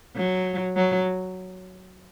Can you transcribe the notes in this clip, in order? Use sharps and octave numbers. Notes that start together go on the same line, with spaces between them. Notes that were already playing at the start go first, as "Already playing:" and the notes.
F#3
F#3